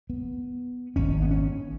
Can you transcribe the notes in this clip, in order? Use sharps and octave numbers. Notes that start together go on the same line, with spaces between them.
B3
G#1 G#2 C#4
B3
C#4